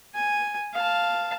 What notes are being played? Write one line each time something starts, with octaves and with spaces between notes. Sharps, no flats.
G#5
F5 A5